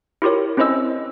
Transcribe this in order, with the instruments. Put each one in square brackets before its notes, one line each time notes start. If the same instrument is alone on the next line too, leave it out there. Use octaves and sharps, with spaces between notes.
[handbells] E4 F4 G4 A#4 C#5
C4 C#4 E4 C5 D#5 E6